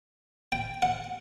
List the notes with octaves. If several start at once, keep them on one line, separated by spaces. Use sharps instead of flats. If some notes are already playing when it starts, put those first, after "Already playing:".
G5
F#5